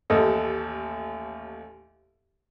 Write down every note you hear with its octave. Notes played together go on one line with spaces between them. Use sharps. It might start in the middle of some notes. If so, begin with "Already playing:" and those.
A1 D#2 A4 D#5